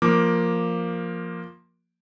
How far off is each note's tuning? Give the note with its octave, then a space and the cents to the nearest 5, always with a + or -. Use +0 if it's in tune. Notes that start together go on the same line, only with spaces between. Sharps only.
F3 +0 A#3 +0 D6 +0